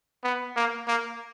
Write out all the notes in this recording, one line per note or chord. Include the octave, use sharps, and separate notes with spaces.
B3
A#3
A#3